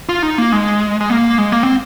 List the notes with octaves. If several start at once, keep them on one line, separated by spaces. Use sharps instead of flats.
F4
D#4
A#3
G#3
G#3
A#3
G#3
A#3
C4